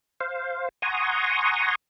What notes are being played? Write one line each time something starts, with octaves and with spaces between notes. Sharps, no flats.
C5 F5
F#5 G#5 A#5 C6 C#6 D#6